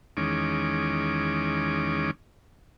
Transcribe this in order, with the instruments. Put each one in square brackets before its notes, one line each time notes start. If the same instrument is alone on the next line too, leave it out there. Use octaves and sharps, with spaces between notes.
[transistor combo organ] E2 D#3 G#3 C#4 D6